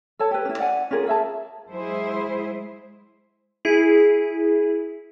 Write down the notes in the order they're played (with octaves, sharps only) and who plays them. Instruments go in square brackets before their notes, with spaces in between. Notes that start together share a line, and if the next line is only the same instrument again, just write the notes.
[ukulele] A4 C#5 A5
G4 B4
C#4 E4
D5 F#5 G#5
C#4 F4 G#4 A#4
G#4 E5 A5
[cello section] F#3 G#3 E4 G#4 C5
[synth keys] E4 G#4